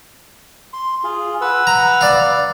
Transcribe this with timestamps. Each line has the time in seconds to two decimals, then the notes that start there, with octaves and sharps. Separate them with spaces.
0.73 C6
1.04 F4 G#4
1.41 B4 F#5 E6
1.67 A#5
2.01 D5 F5